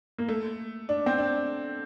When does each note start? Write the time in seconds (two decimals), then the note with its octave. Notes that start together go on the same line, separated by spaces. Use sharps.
0.18 A#3
0.28 A3
0.89 D4
1.06 C4
1.18 D4